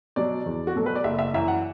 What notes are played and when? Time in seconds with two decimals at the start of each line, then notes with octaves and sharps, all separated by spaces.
0.16 B2 F#3 D5
0.46 E2
0.67 F#4
0.75 B2 F#3 A4
0.86 B4
0.95 D5
1.04 F#1 E5
1.19 E5
1.34 F#2 E3 E5
1.48 F#5